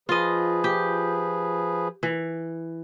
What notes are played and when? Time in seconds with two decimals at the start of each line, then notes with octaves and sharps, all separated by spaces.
0.09 F3 F4 G#4 B4 D#5
0.64 G4
2.03 E3